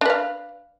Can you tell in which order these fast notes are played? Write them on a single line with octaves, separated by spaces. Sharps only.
D4 B4 F5